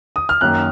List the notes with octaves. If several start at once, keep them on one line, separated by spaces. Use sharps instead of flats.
D#6
F6
F#2 D#3 A#3 F#6